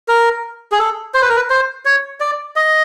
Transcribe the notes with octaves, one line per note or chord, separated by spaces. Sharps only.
A#4
G#4
A4
C5
B4
A#4
B4
C5
C#5
D5
D#5